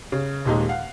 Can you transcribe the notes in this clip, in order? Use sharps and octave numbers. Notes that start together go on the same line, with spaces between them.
C#3
D#1 D#2 A#2 G#3 D#4
F5 F#5